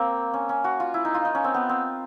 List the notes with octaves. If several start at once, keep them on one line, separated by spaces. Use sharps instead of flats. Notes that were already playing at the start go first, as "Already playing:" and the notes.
Already playing: A#3 C4
C#4
C#4
F#4
F4
E4
D#4
F4
D#4
C#4
C4
B3
C4